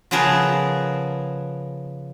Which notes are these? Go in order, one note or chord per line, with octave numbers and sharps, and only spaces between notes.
C#3 F3 B3 G#4 A#4 A5